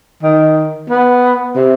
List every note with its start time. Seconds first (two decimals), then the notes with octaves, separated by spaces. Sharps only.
0.22 D#3
0.90 B3
1.56 C3